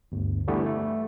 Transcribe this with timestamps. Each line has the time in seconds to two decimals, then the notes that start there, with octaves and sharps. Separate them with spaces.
0.12 G1 D2
0.47 D3 E3 G3 A3 B3
0.66 A3